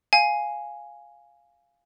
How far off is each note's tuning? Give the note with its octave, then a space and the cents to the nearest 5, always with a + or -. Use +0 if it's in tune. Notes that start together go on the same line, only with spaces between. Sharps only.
F5 +0 G#5 +0